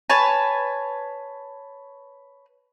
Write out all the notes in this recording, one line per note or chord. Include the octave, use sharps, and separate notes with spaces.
B4 C#5 G#5 A5